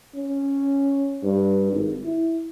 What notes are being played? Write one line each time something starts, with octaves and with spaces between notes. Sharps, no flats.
C#4
G2
G#1
E4